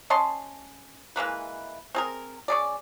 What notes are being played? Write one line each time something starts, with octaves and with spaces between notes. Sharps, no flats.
C#4 D#5 A5 C6
E3 G#3 A#3 B4
C4 G#4 A#4
C#4 G#4 D5